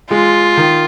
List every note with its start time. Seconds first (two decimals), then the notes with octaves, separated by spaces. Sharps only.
0.11 G#3 F4
0.57 D#3